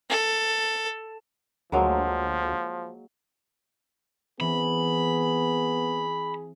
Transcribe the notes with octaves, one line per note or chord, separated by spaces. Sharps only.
A4
D2 F3 F#3 G#3 A#3
E3 B3 C4 G#4 B5